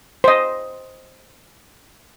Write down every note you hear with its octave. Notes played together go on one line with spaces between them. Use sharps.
C5 D#5